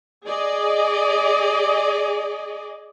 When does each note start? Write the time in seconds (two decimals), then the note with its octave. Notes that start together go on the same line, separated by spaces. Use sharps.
0.26 G#4 D5 D#5